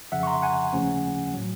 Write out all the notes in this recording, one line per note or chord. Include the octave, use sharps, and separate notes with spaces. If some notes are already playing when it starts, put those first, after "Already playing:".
F2 C#3 F3 E5 F#5
C#6
A#5 C6
F#5 G#5
D#2 C#3 F3 A3 C#4
A2 F#3